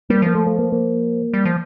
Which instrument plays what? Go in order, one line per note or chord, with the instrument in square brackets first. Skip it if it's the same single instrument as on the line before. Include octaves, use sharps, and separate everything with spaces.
[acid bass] G3 [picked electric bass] A#3
[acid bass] F3 [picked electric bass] A#3
[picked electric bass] A3
A3
A#3
A#3
[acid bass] G3
F3